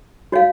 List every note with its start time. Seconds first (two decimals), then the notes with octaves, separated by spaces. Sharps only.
0.32 F#4 C#5 F5